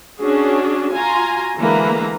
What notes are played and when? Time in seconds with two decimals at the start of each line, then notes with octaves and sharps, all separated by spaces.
0.19 C#4 D4 F#4 G#4
0.92 F4 F#4 G#5 A#5 C6
1.57 D3 E3 G#3 A#3 B4 A#5